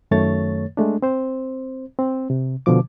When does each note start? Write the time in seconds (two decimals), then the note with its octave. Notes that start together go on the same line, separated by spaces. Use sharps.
0.11 F#2 D#3 A3 C#5 A6
0.77 G#3 A3 D4
1.02 C4 C5
1.99 C4
2.30 C3
2.66 B2 D3 F3 D6